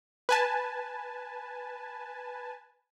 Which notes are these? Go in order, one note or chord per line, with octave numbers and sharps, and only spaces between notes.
B4 G#5 A5